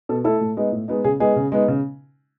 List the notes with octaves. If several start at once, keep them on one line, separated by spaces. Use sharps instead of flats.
B2 A4
A3 E4 A4
A2
G#3 B3 D#4
A2
G#3 B3 D#4
C#3 G#4
G#3 B3 D#4 G#4
C#3
G#3 B3 D#4
C#3